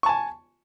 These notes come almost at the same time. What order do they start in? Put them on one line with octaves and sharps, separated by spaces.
C#6 A5 G#5